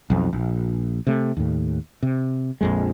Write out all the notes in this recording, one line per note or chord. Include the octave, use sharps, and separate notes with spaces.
B1 F2
A#1
C3 A3
D#2 A2
C3
A#1 F2 G#3